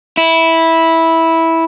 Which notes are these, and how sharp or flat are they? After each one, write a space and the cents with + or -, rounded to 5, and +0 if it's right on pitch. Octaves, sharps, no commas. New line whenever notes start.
E4 -10